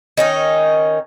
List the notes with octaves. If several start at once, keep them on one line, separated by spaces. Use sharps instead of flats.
D#3 C#4 D#4